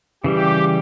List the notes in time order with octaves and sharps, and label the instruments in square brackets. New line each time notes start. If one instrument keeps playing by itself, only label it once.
[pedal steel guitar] C#3 E3 G3 [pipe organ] G4